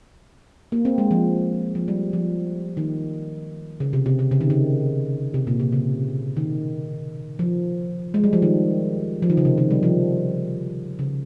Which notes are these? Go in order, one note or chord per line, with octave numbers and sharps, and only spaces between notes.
A#3
C4
G#3
F3
F3
G3
F3
D#3
C#3
C3
C3
C3
C#3
D#3
C#3
C3
A#2
C3
C#3
D#3
F3
G#3
G3
F3
D#3
F3
D#3
C#3
C3
D#3
G3
F3
C#3